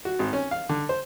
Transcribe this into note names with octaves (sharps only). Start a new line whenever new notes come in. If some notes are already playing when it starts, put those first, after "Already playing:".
F#4
G#1
C#4
F5
D3
C5